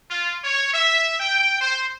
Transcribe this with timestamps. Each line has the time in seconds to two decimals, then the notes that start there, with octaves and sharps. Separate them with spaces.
0.11 F4
0.44 C#5
0.74 E5
1.20 G5
1.61 C5